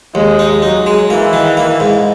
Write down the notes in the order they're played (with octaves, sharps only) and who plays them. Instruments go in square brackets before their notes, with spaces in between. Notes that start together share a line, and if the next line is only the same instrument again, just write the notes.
[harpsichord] D#2 [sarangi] G#3
[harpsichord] D#4
[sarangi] F#3 [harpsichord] D#4
[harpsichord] G#3
[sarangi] E3 [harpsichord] A#3
[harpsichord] D#3
A#3
G#2